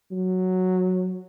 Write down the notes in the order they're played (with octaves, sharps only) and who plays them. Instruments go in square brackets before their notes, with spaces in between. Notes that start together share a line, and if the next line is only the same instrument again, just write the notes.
[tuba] F#3